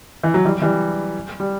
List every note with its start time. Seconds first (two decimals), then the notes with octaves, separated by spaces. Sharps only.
0.23 E3
0.34 F#3
0.45 E3 G3
0.62 E3 G3
1.40 G3